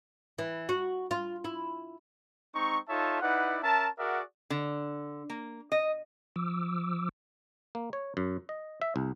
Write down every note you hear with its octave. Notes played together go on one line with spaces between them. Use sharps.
E3
F#4
F4
E4
G#3 C4 D#4 A#5 C#6
D#4 F4 A4 C#5 E5 A5
D#4 E4 B4 D5 F#5
C#4 A#4 E5 A5
F#4 G#4 A#4 D5 E5 F#5
D3
A#3
D#5
F3 D6 E6
A#3
C#5
F#2
D#5
E5
C2